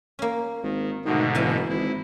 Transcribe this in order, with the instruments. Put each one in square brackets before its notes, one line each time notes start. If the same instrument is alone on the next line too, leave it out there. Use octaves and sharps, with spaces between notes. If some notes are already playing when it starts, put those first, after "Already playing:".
[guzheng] A#3 C#4
[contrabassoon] G#1 [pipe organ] D#3
[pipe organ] G#2 B2 D3 [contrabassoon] D#3 [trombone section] A3 B3 F#4
[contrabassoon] F#1 [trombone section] E3 [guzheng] C#4 G#5 A5
[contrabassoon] G#1 [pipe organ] E4